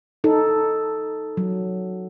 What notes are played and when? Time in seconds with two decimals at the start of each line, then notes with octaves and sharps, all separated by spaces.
0.24 D#4 A4
1.37 F#3